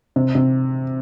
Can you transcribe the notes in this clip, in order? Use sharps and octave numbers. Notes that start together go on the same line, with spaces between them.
C3
C3